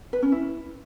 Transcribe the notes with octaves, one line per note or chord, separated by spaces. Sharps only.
B4
C#4
E4